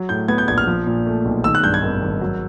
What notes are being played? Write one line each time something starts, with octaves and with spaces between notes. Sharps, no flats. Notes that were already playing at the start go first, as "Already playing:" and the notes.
Already playing: F#3
A2 G6
B3 G#6
G6
A#1 G#6
F6
F3
A#2
A3
B1
D#3 E6
F#6
G2 G6
G#6
G#1
G#1
F#3